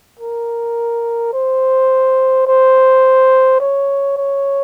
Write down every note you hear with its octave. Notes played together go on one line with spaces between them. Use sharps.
A#4
C5
C5
C#5
C#5